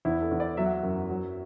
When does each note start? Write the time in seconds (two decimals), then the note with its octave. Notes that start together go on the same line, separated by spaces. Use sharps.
0.05 E2 E4
0.22 A4
0.31 E2
0.40 D5
0.57 F#3 E5
0.66 F#5
0.73 E5
0.83 F#2
1.09 F#3